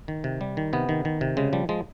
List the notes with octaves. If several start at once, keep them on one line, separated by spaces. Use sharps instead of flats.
D#3
C3
G3
D#3
C3 B3
D#3
D#3
C3
C#3 G#3
F3 G3
F3 G#3